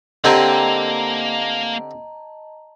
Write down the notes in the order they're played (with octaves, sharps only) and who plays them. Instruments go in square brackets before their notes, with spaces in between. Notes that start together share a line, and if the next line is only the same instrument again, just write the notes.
[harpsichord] D3 C4 G4 [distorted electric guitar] A#3 [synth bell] D#5 A5 A#5